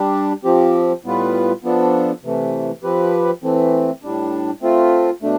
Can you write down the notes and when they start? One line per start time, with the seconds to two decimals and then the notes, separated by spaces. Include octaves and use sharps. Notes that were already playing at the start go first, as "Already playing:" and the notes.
Already playing: G3 D4 G4
0.44 F3 C4 G4
1.04 A2 G3 B3 F4 B4
1.64 F3 B3 D4 A4
2.23 C3 E3 A3
2.83 F3 C4 G4 B4
3.42 E3 A3 C4
4.03 A2 G3 D4
4.62 A3 C4 F4
5.22 B2 A3 D4